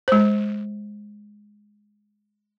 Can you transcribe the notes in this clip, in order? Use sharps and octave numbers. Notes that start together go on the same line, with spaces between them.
G#3 C5